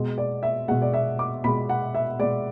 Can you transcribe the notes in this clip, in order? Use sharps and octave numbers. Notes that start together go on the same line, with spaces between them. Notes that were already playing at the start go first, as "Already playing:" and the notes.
Already playing: B2 G#3
D5
E5
B2 G#3 F#5
D5
E5
D6
B2 G#3 B5
F#5
E5
B2 G#3 D5